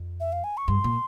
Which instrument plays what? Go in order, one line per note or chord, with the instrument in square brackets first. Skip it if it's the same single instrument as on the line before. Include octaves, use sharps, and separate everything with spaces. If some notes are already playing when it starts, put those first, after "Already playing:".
Already playing: [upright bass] F2
[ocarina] E5
F5
G#5
C#6
[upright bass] G2 [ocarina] C6
[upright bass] A#2